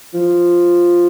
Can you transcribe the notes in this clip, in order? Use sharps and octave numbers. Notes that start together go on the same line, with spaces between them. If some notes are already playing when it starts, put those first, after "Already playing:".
F3